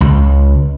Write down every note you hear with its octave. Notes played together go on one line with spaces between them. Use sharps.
C#2